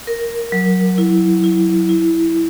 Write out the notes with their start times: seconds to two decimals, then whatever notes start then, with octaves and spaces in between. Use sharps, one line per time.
0.07 A#4
0.52 F#3
0.98 E4
1.44 E4
1.89 E4